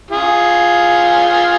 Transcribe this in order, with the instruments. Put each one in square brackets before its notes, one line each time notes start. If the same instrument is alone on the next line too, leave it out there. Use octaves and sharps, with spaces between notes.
[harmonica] F4 G#4